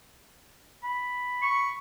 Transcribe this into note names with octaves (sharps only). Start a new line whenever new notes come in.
B5
C#6